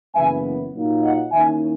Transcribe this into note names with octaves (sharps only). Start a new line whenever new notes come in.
F#1 F#2 E3 B3 E5 G#5
A#2 F#3 A#3 D#4
D#5 F#5
D#2 D#3 A#3 C#4 E4 E5 G#5